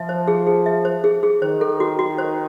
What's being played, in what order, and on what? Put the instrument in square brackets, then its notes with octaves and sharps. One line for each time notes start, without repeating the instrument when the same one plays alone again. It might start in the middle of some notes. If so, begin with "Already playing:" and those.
Already playing: [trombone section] F3 [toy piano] E5
[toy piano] C5
G#4
G#4
E5
C5
G#4
G#4
[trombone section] D#3 [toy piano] C5
[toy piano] A4
F#4
F#4
C5